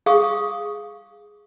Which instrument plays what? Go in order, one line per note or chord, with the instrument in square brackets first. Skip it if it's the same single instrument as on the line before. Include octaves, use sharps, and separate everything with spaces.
[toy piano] G#4 F5 C#6 D#6